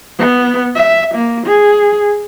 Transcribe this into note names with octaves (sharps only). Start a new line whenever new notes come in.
B3
E5
A#3
G#4